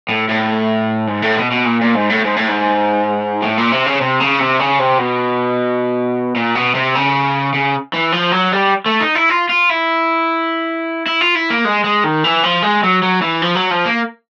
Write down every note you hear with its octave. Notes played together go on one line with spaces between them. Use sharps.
A2
A2
G#2
A2
B2
B2
A#2
A#2
G#2
A2
G#2
A2
G#2
A2
A#2
C3
C#3
C3
C#3
C3
C#3
C3
B2
A#2
B2
C3
C#3
C#3
E3
F3
F#3
G3
A3
D#4
E4
F4
F4
E4
E4
F4
E4
A#3
G#3
G#3
D#3
E3
F3
G#3
F#3
F#3
E3
F3
F#3
F3
A#3